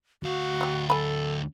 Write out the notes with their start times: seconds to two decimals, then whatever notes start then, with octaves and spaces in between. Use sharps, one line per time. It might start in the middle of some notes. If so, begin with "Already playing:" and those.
0.23 D2 F#4 F5
0.61 F#3 G4
0.90 A4 G#5 B5